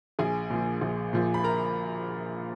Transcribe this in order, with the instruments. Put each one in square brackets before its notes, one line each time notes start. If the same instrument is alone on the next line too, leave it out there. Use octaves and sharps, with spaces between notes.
[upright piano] A#1 G#4 G#5
A#2 F3
A#1
A#2 F3
B5
A#4 A#5